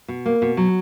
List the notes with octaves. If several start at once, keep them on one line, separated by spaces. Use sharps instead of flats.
B2
A#3
B2
F#3